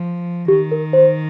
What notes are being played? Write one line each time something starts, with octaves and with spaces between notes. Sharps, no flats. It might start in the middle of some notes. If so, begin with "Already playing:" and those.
Already playing: F3
D#3 G4
A#4
C5